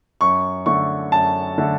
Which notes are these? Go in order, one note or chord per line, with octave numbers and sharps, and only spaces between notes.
F#2 C#6
D3 A3 C#6
F#2 A5
D3 A3